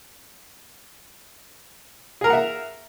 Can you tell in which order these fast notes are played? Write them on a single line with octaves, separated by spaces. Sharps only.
G#4 A#4 A#5 F#5 E5